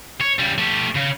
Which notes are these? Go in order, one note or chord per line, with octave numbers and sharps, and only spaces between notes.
C#5
C#3 G3
A3 G4
C#3